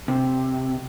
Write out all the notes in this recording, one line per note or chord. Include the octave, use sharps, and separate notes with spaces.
C3